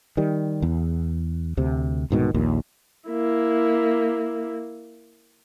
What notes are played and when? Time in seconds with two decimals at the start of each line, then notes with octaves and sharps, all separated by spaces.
0.17 D#3 G3
0.62 E2
1.57 D2 C3
2.10 C2 G#2 B2 D#3
2.34 A#1 D#2 A#2
3.09 A#3 E4